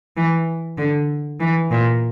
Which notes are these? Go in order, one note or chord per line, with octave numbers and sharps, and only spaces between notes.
E3
D3
E3
A#2